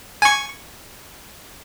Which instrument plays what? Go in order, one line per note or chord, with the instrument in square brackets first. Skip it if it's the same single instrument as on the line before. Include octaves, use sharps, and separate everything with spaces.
[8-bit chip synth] G#5 C#6